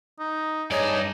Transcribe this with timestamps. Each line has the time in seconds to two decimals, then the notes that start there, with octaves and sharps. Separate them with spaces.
0.19 D#4
0.71 G2 D#4 G#4 C#5 D5